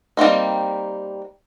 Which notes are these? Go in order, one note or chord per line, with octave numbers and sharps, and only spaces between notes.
G3 A#3 C4 D#4